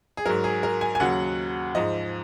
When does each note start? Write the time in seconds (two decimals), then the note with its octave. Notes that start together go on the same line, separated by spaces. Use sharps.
0.17 G#4
0.26 G#2 F#3 A#4
0.44 G#4
0.63 A#4
0.81 G#5
0.95 G#5
1.00 D#2 C#3 F#3 F#5
1.75 G#2 F3 D#5